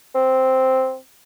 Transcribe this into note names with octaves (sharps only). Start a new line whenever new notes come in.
C4